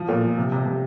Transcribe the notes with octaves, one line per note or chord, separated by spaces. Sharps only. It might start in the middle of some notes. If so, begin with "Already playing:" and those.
Already playing: F3
A#2
F3
C3
C3
C3